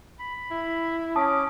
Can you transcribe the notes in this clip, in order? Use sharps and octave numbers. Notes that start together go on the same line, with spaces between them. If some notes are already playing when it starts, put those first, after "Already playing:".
B5
E4
C#4 A5 D6 D#6